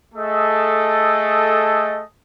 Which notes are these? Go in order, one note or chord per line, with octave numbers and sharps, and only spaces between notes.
A3 G#4 A4 D#5